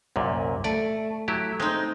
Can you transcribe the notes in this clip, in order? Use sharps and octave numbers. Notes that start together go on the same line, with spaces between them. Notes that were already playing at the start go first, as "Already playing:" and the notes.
C2 F#2 A#2
A3 D5
F#3 E4 G4
G#3 C4 D#4